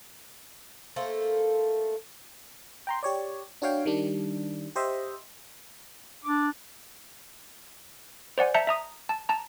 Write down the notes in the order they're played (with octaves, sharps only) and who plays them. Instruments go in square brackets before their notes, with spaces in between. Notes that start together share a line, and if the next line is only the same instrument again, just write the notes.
[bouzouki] A3 A#3 A4 C5
[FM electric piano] G5 A#5 C6
G4 C#5 D5
D4 F#4 C#5 F5 G5
D#3 G3 D4
G4 C5 D#5 E5
[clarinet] D4 [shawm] D6
[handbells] C5 D5 F#5 G#5
E5 A5 A#5 G6 C#7
E5 A#5 D#6
A5
A5 A#5